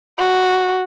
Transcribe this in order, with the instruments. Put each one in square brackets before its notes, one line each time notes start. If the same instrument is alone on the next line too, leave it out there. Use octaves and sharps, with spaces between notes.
[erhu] F#4